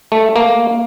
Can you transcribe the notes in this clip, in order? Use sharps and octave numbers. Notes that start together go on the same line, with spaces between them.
A3
A#3